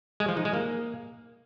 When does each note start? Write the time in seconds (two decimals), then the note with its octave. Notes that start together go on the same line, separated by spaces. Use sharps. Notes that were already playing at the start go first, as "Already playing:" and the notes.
0.20 G#3
0.29 F3
0.37 D#4
0.45 G#3
0.54 A#3